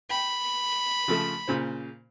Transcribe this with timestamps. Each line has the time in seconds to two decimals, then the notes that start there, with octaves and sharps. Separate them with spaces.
0.10 G5 B5
1.08 C#3 F3 A3
1.48 A#2 C#3 C5